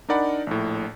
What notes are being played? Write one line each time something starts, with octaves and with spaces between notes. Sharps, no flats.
D4 D#4 A#4 D5 F#5 B5
A#1 A2